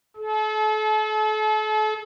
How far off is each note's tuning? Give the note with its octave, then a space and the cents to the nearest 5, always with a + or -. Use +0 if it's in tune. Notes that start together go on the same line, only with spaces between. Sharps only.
A4 -40